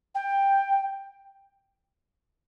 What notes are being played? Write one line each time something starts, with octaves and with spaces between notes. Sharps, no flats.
G5